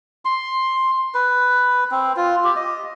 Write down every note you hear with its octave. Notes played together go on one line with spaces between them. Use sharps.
C6
B4
C4
F4
G4
D#5